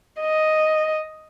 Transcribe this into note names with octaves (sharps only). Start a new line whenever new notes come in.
D#5